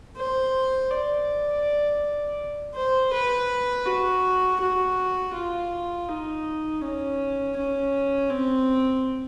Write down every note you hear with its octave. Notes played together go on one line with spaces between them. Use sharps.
C5
D5
C5
B4
F#4
F#4
F4
D#4
C#4
C#4
C4